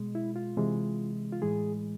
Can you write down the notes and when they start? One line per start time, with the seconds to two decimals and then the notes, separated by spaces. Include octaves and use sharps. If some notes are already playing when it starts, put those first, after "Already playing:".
Already playing: B2 G#3
0.15 E4
0.36 F4
0.57 C3 E3 G#3
1.32 F4
1.42 A2 E3 G#3 G#4